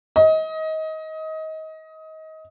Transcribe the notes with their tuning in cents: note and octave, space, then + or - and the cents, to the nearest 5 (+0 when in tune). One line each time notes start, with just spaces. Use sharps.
D#5 +25